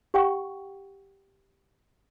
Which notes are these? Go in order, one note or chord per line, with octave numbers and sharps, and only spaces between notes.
G4 F#5 G5 C#6